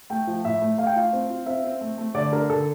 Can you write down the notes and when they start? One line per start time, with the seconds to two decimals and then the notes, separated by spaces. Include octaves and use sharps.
0.10 A3 G5
0.27 F3
0.44 A2 E5
0.62 A3
0.78 A3 F5
0.86 G5
0.93 F4 F5
1.13 C4
1.30 F4
1.46 C4 E5
1.64 C4
1.81 A3
1.98 A3
2.14 D3 D5
2.32 D4 A#4
2.50 D3 A4